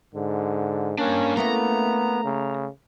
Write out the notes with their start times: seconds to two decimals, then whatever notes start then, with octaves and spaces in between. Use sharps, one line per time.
0.15 G#2 D3
0.99 G3 A#3 C#4 D4
1.37 A3 B3 C#4 E4 A#5
2.24 C#3